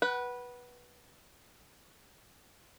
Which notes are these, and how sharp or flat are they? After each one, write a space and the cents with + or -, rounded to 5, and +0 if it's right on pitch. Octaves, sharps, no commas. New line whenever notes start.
B4 -15 F#5 +20